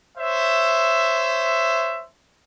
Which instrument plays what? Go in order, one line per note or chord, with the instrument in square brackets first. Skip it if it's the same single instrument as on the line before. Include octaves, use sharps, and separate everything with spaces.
[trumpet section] C5 C#5 E5